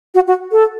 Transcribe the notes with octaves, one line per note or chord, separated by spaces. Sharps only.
F#4
F#4
A4